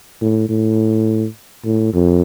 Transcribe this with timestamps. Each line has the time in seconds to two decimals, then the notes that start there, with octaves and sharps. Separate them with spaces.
0.21 A2
0.49 A2
1.65 A2
1.93 F2